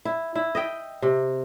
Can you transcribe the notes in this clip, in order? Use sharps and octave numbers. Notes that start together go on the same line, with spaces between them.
E4
E4
D#5 E5 G5
C3